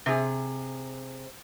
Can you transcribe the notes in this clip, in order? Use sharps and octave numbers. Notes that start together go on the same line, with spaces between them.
C3 G#4